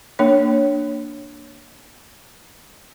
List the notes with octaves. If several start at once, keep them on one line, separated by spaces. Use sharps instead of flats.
A#3 D4 C#5